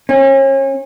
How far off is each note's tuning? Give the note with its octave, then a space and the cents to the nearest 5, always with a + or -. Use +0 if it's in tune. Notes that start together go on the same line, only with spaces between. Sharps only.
C#4 -35